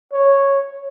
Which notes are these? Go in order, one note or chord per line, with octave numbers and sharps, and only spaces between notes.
C#5